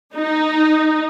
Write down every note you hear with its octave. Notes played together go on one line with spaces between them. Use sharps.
D#4